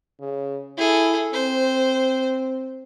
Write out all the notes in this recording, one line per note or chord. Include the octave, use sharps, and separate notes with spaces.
C#3
E4 G#4 A4
C4 C5